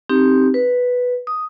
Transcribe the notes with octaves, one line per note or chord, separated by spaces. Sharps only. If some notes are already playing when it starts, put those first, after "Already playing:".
C4 D#4 G4
B4
D#6